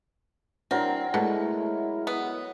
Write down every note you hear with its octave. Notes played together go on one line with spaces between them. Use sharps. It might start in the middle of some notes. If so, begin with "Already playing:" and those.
F#3 C4 D4 E4 A#4
B2 G#3 A3 E4
B3